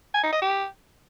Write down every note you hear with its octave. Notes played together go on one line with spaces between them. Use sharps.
G#5
D#4
D#5
G4